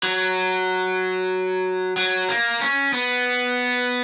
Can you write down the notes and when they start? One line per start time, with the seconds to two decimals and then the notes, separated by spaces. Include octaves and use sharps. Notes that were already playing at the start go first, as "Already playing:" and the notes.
0.03 F#3
1.97 F#3
2.29 A#3
2.61 C#4
2.93 B3